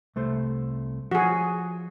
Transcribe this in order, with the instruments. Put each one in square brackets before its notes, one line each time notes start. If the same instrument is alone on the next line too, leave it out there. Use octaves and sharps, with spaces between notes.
[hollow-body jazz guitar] C2 A3 C5
[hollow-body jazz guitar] F3 [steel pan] F#4 G#4